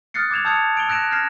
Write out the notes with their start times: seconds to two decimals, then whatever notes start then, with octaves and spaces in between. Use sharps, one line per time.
0.14 D#6 F6 F#6 A6 C7 C#7
0.31 D6 G#6 E7 F7
0.45 A5 D#6 E6 G6 G#6 C#7
0.77 D7 F7 G7
0.89 E6 F#6 A#6 D7 E7
1.11 F6 G6 G#6 A#6 C7 E7